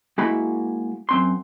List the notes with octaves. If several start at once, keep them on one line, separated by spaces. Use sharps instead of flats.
G#3 A#3 E4 F#4 B5
F#2 C4 C6